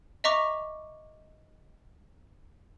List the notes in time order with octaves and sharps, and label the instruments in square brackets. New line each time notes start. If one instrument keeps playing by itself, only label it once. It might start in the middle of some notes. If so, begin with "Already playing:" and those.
[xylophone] D#5 E5 A#5 C#6 D6